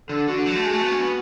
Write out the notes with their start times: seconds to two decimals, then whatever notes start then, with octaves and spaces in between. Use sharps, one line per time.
0.09 D3 A4
0.28 D3 F#4
0.46 F#3
0.55 A3
0.64 G#3
0.73 A3
0.82 B3
0.91 C#4
1.00 B3